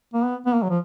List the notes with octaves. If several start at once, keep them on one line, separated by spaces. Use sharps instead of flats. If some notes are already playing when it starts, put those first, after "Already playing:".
A#3
B3
B3
A#3
F#3
F3